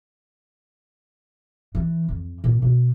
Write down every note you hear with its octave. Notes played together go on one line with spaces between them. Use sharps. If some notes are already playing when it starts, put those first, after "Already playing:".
E3
F2
A#2
B2